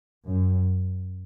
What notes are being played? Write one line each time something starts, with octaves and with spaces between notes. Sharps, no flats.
F#2